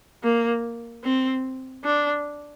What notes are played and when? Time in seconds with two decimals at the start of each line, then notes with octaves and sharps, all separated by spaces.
0.24 A#3
1.04 C4
1.84 D4